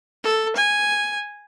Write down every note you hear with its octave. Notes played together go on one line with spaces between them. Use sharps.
A4
G#5